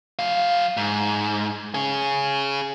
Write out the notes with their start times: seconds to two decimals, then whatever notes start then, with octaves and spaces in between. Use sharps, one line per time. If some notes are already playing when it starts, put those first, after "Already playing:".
0.19 F#3 F5
0.77 G#2
1.75 C#4 G#4